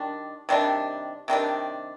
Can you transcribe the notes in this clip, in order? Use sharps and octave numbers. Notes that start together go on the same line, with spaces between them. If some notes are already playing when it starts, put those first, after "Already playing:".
Already playing: D#3 G3 D4
C3 D#3 G3 D4
C3 D#3 G3 D4